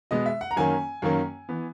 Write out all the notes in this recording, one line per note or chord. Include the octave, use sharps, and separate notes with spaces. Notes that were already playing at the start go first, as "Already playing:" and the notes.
B2 G#3 B3 D#5
E5
F#5
A#5
F#2 D#3 A#3 C#4 G#5
F#2 D#3 A#3 C#4
E3 B3